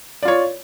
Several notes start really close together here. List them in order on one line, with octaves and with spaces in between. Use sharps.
D5 F4 C#5